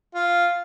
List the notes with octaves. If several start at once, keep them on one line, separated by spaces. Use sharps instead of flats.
F4